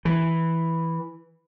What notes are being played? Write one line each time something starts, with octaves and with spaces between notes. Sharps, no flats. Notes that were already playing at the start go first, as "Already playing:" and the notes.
E3